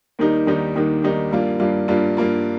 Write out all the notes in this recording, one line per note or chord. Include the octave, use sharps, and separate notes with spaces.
D#2 D#3 G3 D#4 G4
D#2 D#3 G3 D#4 G4
D#2 D#3 G3 D#4 G4
D#2 D#3 G3 D#4 G4
G2 G3 A#3 F4
G2 G3 A#3 F4
G2 G3 A#3 F4
G2 G3 A#3 F4